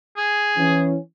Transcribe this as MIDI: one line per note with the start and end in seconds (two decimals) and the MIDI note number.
0.17 0.80 68
0.57 0.96 52
0.57 0.96 61